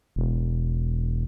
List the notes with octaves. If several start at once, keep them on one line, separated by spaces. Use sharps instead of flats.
E1